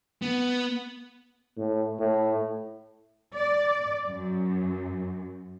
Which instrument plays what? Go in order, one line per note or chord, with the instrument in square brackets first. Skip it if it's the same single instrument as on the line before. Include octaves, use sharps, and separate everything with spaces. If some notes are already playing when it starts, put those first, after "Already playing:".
[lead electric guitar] B3
[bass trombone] A2
A2
[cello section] D5
F#2